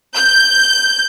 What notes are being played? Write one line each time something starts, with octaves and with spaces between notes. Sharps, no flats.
G6